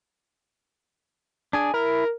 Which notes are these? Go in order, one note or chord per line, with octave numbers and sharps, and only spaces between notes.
D4 G#4 G#5
E4 A#4